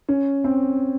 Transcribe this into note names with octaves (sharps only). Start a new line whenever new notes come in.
C#4
C4